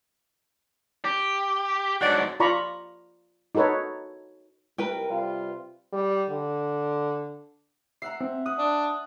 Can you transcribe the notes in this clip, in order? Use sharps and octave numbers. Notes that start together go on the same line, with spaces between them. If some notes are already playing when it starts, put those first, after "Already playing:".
G4
G#2 F#3 D4 F#4 D5
F4 D5 A#5 B5 C#6
D#4 F#4 A4 B4 C#5
C2 A#4 B4 G5
C3 G3 F4
G3
D3
E5 F#5 A#5 C7
C4
F#5 D#6
D4